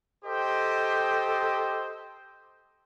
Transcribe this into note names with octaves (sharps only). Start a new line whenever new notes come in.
G4 A4 C5 D#5 G5